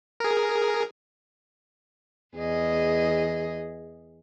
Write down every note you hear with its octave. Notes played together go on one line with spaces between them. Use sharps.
G#4 A#4
E2 G#4 D#5